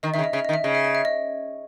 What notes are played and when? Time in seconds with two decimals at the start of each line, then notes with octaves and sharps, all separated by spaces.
0.03 D#3 D#5
0.14 D#3 E5
0.19 C#3
0.24 D#5
0.33 C#3 E5
0.45 D#3 D#5
0.54 E5
0.64 C#3 D#5
0.75 E5
0.85 D#5
0.95 E5
1.05 D#5